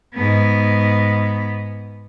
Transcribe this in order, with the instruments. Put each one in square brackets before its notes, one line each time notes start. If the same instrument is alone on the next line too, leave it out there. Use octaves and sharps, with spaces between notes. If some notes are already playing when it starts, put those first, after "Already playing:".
[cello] G#2 B3